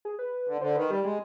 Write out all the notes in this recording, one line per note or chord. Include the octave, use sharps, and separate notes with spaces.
G#4
B4
D3
D3 C5
D#3 B4
G3 G4
G#3 G4